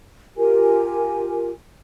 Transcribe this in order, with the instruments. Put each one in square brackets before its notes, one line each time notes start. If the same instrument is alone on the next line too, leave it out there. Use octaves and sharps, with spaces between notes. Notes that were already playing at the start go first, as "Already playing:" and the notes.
[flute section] F4 G4 A#4 G#5